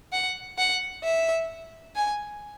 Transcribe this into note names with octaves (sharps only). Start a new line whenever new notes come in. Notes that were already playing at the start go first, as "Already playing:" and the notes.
F#5
F#5
E5
G#5